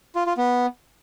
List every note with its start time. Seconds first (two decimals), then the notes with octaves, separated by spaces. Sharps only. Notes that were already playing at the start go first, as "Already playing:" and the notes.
0.16 F4
0.26 F4
0.37 B3